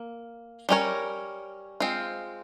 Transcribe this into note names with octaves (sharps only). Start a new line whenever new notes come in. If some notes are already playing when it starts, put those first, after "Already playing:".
Already playing: A#3
G3 C#4 E4 A#4 C#5
G#3 C4 F4